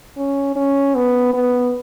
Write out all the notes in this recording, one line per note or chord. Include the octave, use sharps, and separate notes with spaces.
C#4
C#4
B3
B3